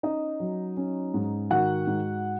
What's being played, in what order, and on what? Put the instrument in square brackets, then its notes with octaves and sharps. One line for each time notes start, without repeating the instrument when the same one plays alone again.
[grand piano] C#4 D#4 D#5
F#3
C#4
G#2
D#3 F#4 F#5
G#2